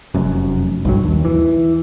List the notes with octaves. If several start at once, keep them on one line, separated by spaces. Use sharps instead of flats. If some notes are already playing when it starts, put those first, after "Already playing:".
F1 F#2
B1 G2 F#3
D#2
E3